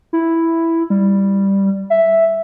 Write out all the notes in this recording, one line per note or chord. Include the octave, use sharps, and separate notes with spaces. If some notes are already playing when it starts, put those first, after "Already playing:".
E4
G3
E5